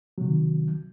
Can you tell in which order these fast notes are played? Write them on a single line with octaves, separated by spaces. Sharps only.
F#3 C3 D#3